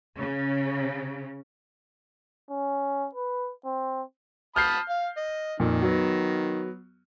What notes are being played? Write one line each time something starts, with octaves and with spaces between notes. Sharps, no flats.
C#3
C#4
B4
C4
A5 B5 D#6 F6 G6 C7
F5
D#5
F2 A#2 D#3
F#3 B3